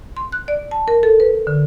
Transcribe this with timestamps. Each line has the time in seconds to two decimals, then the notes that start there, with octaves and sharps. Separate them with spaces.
0.17 C6
0.32 F#6
0.48 D5
0.71 A5
0.88 A#4
1.03 A4
1.20 B4
1.47 D3